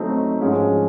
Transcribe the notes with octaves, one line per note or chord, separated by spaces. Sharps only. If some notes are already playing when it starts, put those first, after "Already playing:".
Already playing: F#3 A3 C4 D#4
G#2 F3 G#3 C#4